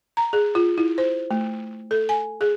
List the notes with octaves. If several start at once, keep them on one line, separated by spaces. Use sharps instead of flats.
A#5
G#4
F4
E4
C5
A3
A4
G#5
G#4